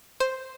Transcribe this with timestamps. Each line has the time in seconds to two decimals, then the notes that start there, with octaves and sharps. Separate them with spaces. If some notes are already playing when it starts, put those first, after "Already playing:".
0.20 C5